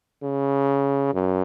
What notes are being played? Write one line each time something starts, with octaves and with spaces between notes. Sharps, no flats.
C#3
F#2